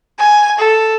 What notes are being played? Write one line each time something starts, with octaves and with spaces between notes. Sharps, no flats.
G#5
A4